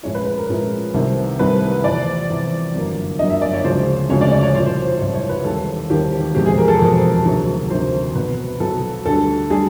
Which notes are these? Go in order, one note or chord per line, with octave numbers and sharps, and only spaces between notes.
A#2 F3 G#3 C#4 E4 C#5
B4
B4
A#4
A#2 F3 G#3 C#4 E4
C2 C3 D#3 G3
C2 C3 D#3 G3 B4
E2 C3 F3 D5
E2 C3 F3
G1 F#2 D3 F#3 A#3
G1 F#2 D3 F#3 A#3 D#5
E5
D5
C#5
D2 C#3 F3 G#3 C#4 C5
D2 C#3 F3 G#3 C#4 C#5
D5
D5
C#5
C2 A#2 F3 C5
C5
C5
C2 A#2 F3 C#5
C#5
B4
E1 D#2 D#3 G3 C4 A4
E1 D#2 D#3 G3 C4 G4
F1 E2 B2 G#3 C4 G4
G#4
A#4
A4
F1 E2 B2 G#3 C4 A#4
D2 C3 D#3 F#3
D2 C3 D#3 F#3 C5
B1 B2 F#3 B3 B4
B1 B2 F#3 B3 A4
D2 D3 G3 A4
D3 G3 G#4